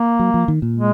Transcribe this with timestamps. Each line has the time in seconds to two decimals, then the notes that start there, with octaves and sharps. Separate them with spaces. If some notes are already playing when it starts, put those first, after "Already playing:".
Already playing: A#3
0.19 F#3
0.34 F3
0.48 D#3
0.62 A#2
0.77 G#3